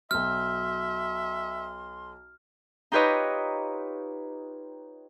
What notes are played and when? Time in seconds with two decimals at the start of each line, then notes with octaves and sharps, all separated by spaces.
0.11 B1 F#3 E5 C6 F6
2.92 D#4 F4 G4 B4 C#5 D#5